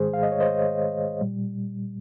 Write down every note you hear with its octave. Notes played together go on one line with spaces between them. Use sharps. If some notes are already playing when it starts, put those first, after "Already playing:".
Already playing: G#2 D#3 G#3 G#4 C5
F5
D#5
C#5
C5 D#5
A#2 G3